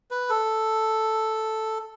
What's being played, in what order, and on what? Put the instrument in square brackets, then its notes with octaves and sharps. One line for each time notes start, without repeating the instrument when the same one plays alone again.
[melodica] B4
A4